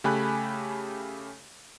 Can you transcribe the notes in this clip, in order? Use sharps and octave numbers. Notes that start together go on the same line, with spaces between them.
C#3 A3 G4 G#5 B5 F#6